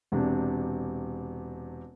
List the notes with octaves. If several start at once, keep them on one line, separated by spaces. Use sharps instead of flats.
E1 C3 D4